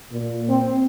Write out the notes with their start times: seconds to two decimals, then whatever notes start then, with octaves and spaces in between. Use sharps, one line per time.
0.13 A#2
0.49 C4